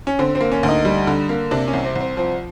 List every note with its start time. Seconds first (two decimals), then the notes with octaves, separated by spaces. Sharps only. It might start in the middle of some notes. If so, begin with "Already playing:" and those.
0.07 C#4
0.19 D3 C4
0.35 C4
0.41 A#3
0.52 C#4
0.63 D2
0.68 D#4
0.85 G3
1.07 D3
1.29 A#3
1.51 C3 D4
1.68 C#4
1.73 C2
1.84 C4
1.95 C2
2.01 C4
2.17 F3 C4